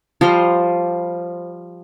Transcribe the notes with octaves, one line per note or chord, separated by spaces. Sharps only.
F3 G3 C5 A#5